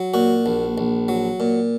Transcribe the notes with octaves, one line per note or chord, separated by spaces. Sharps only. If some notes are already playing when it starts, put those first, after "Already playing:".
Already playing: F#3
A#2 F#4
A#1
A#1
F#3
A#2